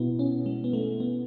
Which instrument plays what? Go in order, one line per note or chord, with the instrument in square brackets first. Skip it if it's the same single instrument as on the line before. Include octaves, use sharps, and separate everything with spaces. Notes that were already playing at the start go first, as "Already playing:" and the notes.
Already playing: [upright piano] B2 E4 [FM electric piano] B3
[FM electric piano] C#4
G#3
B3
A3
B3